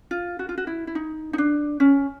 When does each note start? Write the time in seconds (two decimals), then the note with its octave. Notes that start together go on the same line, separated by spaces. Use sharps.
0.11 F4
0.39 F#4
0.49 F4
0.58 F#4
0.67 E4
0.87 E4
0.95 D#4
1.33 D#4
1.38 D4
1.80 C#4